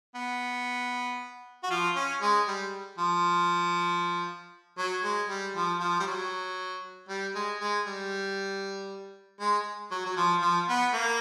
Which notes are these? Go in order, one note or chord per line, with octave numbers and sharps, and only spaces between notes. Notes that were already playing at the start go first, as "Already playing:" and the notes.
B3
F#4
F3 F4
C#4
G#3
G3
F3
F#3
G#3
G3
F3
F3
G3
F#3
G3
G#3
G#3
G3
G#3
F#3
F#3
F3
F3
B3
A#3